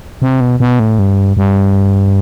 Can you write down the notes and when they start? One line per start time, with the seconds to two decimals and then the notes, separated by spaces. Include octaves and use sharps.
0.22 C3
0.41 B2
0.60 B2
0.79 A2
0.99 G2
1.37 G2